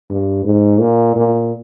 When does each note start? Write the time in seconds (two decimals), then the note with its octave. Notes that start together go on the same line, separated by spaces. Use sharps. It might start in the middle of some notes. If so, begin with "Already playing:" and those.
0.10 G2
0.45 G#2
0.80 A#2
1.16 A#2